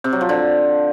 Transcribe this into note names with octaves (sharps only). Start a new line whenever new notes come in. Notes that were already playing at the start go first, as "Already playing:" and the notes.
C3
F#3
F3
D3